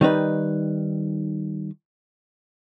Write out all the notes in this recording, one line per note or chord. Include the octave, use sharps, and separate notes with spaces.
D#3 G3 D#4 B4